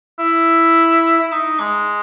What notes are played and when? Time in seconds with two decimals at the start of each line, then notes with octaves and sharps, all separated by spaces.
0.19 E4
1.21 E4
1.32 D#4
1.60 G#3